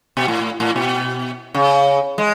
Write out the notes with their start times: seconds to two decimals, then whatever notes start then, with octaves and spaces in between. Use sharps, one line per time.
0.17 B2
0.28 A2
0.60 A2
0.76 B2
1.54 C#3
2.18 G#3